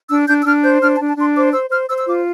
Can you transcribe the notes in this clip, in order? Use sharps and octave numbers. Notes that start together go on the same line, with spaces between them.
D4 E6
D4 G6
E6
D4 F6
C5 G6
D4 F6
A5
D4
A5
D4 C6
C5 D6
C5 E6
C5 F6
C5 E6
E6
F4 D6